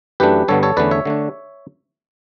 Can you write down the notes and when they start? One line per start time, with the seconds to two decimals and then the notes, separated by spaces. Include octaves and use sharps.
0.20 F#2 E3 A3 D4 G4 B4
0.48 G2 D3 G3 B3 A4 C#5
0.63 A4 C#5
0.77 E2 D3 A3 C#4 B4 D5
0.91 C#5 E5
1.05 D3 A3 D4